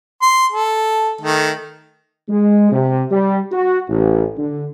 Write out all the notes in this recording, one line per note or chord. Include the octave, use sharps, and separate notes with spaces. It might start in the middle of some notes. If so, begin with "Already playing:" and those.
C6
A4
D#3 A3
G#3
C3
G3
F#4
A1
D3